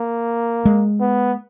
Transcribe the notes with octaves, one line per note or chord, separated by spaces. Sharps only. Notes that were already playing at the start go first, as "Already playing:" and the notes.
Already playing: A#3
G#3
B3